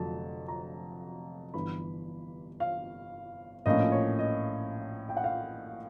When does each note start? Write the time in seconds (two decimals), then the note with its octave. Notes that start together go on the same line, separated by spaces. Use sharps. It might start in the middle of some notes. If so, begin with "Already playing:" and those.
Already playing: F1 F2 D3 F#3 A3 A5
0.48 A#5
1.54 G1 G2 E3 B5
2.60 F5
3.66 A#1 A2 F3 A#3 C#4 D#5
3.92 C#5
4.19 D#5
5.09 G5
5.17 F#5
5.24 F5